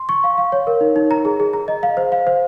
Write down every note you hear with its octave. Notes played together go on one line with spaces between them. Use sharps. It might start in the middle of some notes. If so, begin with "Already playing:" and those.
Already playing: C6
C#6
F5
F5
C#5
A#4
D#4
D#4
A#5
G#4
G#4
A#5
D#5
F5
C5
F5
C5